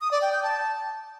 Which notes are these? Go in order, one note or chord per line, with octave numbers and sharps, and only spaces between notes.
D#6
D5
G5
G6
A5